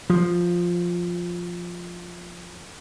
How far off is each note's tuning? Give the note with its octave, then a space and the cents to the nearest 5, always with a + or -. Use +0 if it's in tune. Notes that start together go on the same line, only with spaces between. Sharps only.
F3 +5